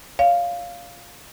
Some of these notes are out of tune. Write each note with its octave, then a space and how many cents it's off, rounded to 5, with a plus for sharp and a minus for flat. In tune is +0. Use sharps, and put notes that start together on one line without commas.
C#5 +40 F5 +0